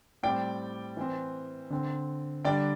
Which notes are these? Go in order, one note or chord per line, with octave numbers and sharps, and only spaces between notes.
A2 G3 C4 D5 G5
E3 C4
D3 C4
D3 G3 D4 D5 G5